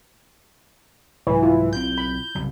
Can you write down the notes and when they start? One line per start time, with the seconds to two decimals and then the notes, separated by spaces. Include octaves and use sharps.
1.27 C2 G#2 E3 F#3
1.43 E4 F4
1.73 B1 D#3 C4 G6
1.98 B5
2.35 F#1 C2